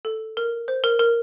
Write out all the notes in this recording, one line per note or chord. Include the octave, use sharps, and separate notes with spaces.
A4
A#4
C5
A#4
A#4